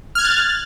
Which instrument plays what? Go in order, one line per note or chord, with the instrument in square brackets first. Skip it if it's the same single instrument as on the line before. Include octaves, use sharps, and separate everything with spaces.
[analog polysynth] F6
G#6
F#6
A6